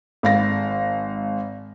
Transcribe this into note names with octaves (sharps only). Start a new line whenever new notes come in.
G#1 F5 A#6